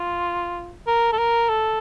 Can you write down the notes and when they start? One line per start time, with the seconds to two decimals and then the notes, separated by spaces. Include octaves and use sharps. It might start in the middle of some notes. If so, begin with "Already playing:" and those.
Already playing: F4
0.87 A#4
1.13 A4
1.18 A#4
1.49 A4